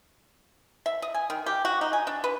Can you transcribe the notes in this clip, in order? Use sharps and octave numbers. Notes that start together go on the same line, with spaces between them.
E5
D#5
G#5
D#3
G4
F#4
D#4
G#5
D4
B4